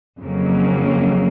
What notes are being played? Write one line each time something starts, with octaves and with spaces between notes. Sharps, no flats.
F2 C#3 F#3 A#3